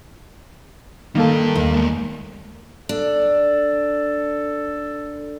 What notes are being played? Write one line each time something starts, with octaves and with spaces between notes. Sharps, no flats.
D#3 G3 A#3 A4 A5
D#2
G#3 B3
D4 A4